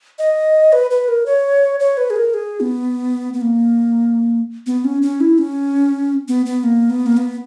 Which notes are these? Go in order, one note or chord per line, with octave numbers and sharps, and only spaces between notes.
D#5
B4
B4
A#4
C#5
C#5
B4
G#4
A#4
G#4
B3
B3
A#3
B3
C#4
C#4
E4
C#4
B3
B3
A#3
B3
A#3
B3